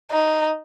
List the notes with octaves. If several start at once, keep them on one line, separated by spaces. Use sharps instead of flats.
D#4